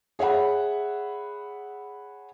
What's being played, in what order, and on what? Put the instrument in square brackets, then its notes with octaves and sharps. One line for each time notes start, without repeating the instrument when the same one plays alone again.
[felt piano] G#4 C#5 E5 F#5 B5